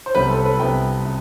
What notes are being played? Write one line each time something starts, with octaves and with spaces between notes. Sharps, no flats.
C5
C2 C3 G3 B3 B4
A4
B4
C2 C3 G3 B3 G5
C3